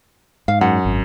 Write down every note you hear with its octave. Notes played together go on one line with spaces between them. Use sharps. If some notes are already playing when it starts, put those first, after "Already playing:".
G#2 F5
F#2 F#5
G#1